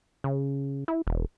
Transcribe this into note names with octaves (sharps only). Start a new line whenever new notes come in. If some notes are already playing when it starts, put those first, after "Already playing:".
C#3
E4
E1